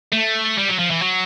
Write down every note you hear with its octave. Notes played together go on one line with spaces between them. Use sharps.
A3
G3
F#3
F3
E3
F#3